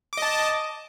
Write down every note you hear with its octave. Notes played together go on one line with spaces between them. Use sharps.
D#5 A5 D6